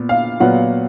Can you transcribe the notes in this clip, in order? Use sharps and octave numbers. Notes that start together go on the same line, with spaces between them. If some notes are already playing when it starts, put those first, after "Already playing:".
Already playing: A#2 B3
F5
A#2 F#3 B3 F#5